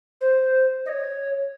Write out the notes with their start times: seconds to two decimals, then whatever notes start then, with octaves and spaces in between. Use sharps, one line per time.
0.21 C5
0.86 D#5
0.89 C#5